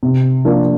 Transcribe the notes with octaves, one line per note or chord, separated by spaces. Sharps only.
C3
F3 A#3 D4 F4